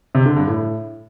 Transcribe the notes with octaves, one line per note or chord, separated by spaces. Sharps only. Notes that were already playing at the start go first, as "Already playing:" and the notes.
C3
D3
G2
A2